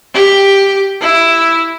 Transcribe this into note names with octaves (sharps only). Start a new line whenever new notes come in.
G4
E4